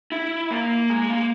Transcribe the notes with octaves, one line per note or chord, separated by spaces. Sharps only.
E4
A#3
G#3
A#3